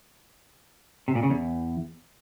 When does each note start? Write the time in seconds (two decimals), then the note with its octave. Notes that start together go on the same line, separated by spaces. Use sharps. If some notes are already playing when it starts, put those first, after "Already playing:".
1.08 C3
1.15 A#2
1.23 C#3
1.30 E2